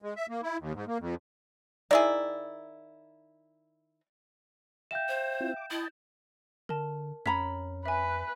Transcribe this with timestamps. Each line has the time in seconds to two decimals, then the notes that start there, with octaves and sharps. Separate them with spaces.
0.02 G#3
0.16 E5
0.29 A#3
0.43 E4
0.58 D#2
0.74 G#2
0.87 A#3
0.99 F2
1.91 D#3 E4 G#4 D5
4.91 E5 F5 G5 G6 E7
5.08 C5
5.40 C4 E4 F4
5.56 D6
5.71 E4 D#5 G5 A5
6.69 D3 A#4 A5
7.26 F2 C#4 A#5 B5 B6
7.86 B4 E5 G#5